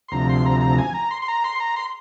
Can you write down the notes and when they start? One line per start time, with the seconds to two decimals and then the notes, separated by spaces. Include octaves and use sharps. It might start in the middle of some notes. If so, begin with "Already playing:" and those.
0.08 C6
0.12 D2 C3 F3 A#5
0.29 C6
0.46 A#5
0.61 A#5
0.78 G#5
0.94 A#5
1.11 C6
1.22 C6
1.28 A#5
1.44 C6
1.60 A#5
1.76 C6